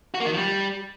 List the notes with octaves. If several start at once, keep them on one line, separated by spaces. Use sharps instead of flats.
F#4
A#3
D#3
F3
G3